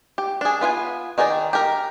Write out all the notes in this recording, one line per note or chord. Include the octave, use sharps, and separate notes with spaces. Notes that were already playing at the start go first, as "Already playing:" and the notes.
G4
D4 G#4
B3 F4 F5 G#5
D#3 D#4 G#4 D5 G5
G4 A#4